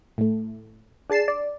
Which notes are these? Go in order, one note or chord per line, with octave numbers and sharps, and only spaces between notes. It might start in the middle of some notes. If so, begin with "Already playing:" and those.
A2 A3
D4 G#4 A5 C7 E7
D5